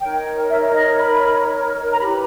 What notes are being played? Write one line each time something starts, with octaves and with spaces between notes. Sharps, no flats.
D#4 A#4 C#5 G5
E5
D#5
B5
A#5
E4 G4 B4 B5